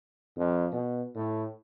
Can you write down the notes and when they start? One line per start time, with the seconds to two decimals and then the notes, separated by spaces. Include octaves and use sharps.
0.37 F2
0.72 B2
1.15 A2